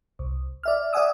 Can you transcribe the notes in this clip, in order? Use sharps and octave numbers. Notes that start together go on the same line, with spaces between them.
C2
D5 E5 F6
D5 E5 F#5 G#5 D#6 E6